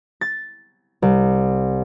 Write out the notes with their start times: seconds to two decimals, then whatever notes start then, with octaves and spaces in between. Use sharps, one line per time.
0.21 A6
1.02 C2